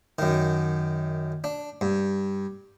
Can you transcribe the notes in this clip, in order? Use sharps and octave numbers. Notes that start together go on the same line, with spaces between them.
F#2 D#3
D4
G2